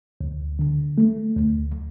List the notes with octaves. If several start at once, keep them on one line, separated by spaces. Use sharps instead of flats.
D2
D3
A3
D2